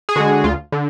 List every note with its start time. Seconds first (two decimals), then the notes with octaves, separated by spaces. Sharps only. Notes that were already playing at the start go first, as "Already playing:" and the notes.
0.09 G#4
0.16 D3 G#3 F#4
0.44 D2 F4
0.72 D3